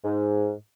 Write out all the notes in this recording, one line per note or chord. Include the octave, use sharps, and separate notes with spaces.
G#2